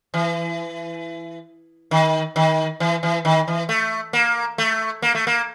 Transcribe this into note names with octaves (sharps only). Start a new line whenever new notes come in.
E3
D#3
D#3
E3
E3
D#3
E3
A3
A#3
A3
A#3
A3
A#3